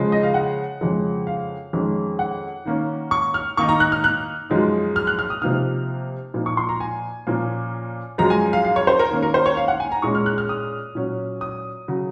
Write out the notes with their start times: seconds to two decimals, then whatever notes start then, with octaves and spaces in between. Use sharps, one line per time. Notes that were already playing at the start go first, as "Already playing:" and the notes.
Already playing: C#3 F3 G#3
0.12 D#5
0.23 F5
0.34 F#5
0.81 F2 C#3 F3 G#3
1.27 F5
1.73 F2 D#3 G#3 C#4
2.19 F#5
2.65 D#3 A#3 C#4
3.11 C#6
3.34 F6
3.57 D#3 A#3 D#4 C#6
3.69 A#5
3.80 F#6
3.92 F6
4.04 F#6
4.50 F#2 F3 G#3 D#4
4.96 F6
5.07 F#6
5.19 F6
5.30 D#6
5.42 C3 F3 A#3 D#4 F6
6.34 A#2 F3 A#3 D#4
6.46 C#6
6.57 C6
6.69 A#5
6.80 G#5
7.27 A#2 F3 A#3 C#4
8.18 F#2 F3 G#3 A#5
8.30 G#5
8.53 F5
8.65 F5
8.76 C#5
8.87 C5
8.99 A#4
9.11 D#3 A#3 C#4
9.23 A#4
9.34 C5
9.46 C#5
9.57 F5
9.68 F#5
9.80 G#5
9.92 A#5
10.02 A#2 G#3 C#4 C#6
10.15 F6
10.26 F#6
10.38 F6
10.49 D#6
10.95 A#2 F#3 C#4
11.41 D#6
11.88 C#3 F#3